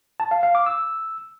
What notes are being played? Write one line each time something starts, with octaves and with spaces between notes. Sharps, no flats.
A5
F5
F5
D6
E6